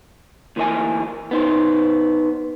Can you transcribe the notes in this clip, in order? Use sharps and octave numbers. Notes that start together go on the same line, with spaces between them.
D2 E3 A#3 C5 D#5 G#5
B3 D#4 C5